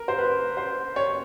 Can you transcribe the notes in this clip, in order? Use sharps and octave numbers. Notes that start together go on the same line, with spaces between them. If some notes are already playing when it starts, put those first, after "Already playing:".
Already playing: A#4
C5
B4
C5
C#5